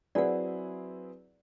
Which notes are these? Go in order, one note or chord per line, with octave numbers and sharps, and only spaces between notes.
F#3 C4 E4 G#4 B4 D5 F#5